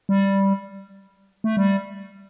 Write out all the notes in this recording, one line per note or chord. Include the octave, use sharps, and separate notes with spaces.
G3
A3
G3